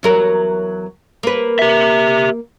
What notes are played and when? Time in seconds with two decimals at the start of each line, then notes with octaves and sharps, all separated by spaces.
0.03 E2 F#3 A#4
1.23 A#3 B4
1.59 G4 E5